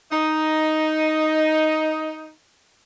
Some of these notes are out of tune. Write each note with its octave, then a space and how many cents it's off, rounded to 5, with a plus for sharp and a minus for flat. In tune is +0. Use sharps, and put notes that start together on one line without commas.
D#4 +5